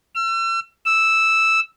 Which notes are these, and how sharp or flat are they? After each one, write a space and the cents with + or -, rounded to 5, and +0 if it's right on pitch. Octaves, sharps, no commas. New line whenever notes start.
E6 +40
E6 -5